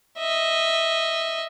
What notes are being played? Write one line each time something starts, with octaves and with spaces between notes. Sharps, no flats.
D#5 E5